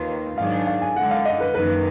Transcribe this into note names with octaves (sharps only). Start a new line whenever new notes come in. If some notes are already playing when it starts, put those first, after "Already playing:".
Already playing: D#2 D#3 A#3 F4 B4
G#2 D#3 F#3 D4 G#4 F5
F5
G#5
F#2 D3 G#3 F#5
F5
D#5
B4
F#2 D#3 A#3 B4